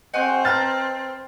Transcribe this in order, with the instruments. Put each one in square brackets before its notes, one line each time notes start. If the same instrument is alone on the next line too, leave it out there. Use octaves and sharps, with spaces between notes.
[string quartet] C4 [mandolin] F#4 G#4 C5 [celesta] D#5 G6 D#7
[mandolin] B4 A5 A#5 [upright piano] F6 A6